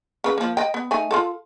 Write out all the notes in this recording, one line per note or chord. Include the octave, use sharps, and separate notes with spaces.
C#3 B4
F3 A#3
D#5 G5
B3
A3 D#4 G#5
F4 F#4 A4